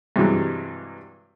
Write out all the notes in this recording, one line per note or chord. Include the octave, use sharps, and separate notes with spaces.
G2 C3 E3 F#3 G#3